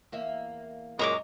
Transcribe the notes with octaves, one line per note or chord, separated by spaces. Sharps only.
E2 A#3 E5
F#2 A#2 G#3 D#5 A#5 C#6 D6